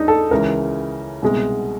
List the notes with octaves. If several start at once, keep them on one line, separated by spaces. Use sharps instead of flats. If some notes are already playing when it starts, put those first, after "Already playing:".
Already playing: D#2 D#3 G#3 D4 D#4
A4
C#2 C#3 E3 A#4
C2 B2 G#3